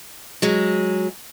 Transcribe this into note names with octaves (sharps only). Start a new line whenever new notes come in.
F#3 G#3